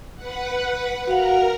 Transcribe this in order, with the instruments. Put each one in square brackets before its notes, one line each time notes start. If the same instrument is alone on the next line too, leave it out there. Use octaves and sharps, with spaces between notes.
[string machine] B4 F#5
[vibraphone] F#4 F5 F#5 [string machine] A#4 A#5